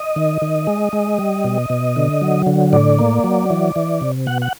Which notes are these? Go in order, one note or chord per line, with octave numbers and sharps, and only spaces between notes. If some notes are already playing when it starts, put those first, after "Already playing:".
Already playing: D#5
D#3
D#3
G#3
G#3
G3
B2
B2
D3
F#3
D3
A2 D5
A#3
F#3
E3
E3
C3
B2 F#5
F#5